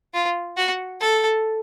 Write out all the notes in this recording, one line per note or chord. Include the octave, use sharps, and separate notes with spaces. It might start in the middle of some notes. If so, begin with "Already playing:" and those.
F4
F#4
A4